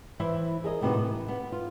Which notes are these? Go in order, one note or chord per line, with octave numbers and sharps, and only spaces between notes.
E3 E4 C5 E5
G#4 A#4 D#5
A2 C3 B3 C4 D#4 F#4
E3
B3
F4